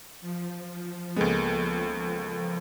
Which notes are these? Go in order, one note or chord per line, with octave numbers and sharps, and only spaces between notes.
F3
C#2 G#3 A#3 B3 A4